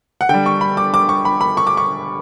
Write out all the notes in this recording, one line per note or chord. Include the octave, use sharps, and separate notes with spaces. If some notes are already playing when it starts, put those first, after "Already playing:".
F#5
D3 G3 G5
C#6
B5
D6
D6
C#6
B5
B5
C#6
D6
C#6